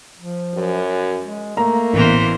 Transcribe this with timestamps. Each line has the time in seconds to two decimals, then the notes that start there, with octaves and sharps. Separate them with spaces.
0.18 F3
0.55 F#2
1.20 G#3
1.57 A3 A#3 A#5
1.93 A1 B2 E3 A#4 C5